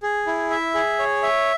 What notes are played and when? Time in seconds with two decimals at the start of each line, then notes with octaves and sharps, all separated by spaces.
0.03 G#4
0.27 E4
0.51 E5
0.74 G#4
0.99 C#5
1.23 E5